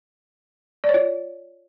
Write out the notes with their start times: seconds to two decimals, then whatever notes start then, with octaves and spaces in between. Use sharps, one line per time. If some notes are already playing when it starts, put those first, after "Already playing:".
0.84 D5
0.89 C#5
0.94 F4